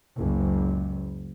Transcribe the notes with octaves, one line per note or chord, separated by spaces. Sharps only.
F#1 C#2